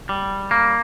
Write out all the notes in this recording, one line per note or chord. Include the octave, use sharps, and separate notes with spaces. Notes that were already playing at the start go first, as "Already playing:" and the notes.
G3
A#3